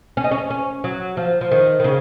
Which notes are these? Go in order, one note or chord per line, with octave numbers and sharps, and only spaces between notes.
C#4
D#4
C#4
C#4
F#3
F3
F3
D#3
D#3
C#3